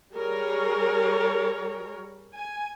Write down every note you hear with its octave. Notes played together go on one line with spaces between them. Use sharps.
G3 G#4 A#4 C#5
G#5